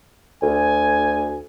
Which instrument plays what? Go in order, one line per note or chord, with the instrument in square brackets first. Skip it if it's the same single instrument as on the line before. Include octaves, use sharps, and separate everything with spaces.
[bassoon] D2 [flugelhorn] G#5